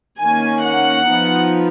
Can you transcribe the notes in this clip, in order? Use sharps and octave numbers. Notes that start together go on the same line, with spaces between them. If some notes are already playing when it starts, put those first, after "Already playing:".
D#3 A#3 C#4 G#5
F#5
F3 B3 D#4